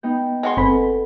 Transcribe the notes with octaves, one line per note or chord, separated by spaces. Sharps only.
B3 D#4 G5
G#3 F#4 C6
G1 C4 A4 B4 B5